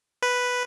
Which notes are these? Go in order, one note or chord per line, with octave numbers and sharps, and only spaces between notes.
B4